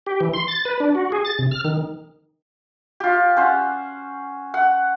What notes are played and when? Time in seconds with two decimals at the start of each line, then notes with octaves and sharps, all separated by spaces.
0.07 G4
0.20 E3
0.34 C6
0.48 A6
0.65 B4
0.80 D4
0.95 F#4
1.12 G#4
1.25 A6
1.39 C3
1.51 F6
1.65 D#3
3.00 F4 G4
3.36 C#4 C5 F#5
4.54 F#5